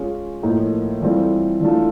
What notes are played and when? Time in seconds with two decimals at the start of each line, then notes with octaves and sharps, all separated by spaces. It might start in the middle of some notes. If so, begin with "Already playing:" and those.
Already playing: G#3 C#4 F4
0.43 A2 F3 A#3 D#4
1.02 E3 G3 C4 F4 A4
1.61 E3 A3 D4 F4 A4